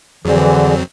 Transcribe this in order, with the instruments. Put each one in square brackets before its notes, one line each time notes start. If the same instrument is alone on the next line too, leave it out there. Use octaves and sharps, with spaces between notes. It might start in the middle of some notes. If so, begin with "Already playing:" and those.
[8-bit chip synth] F2 F#3 C4 [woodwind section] D3 E3 [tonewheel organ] G#4 D5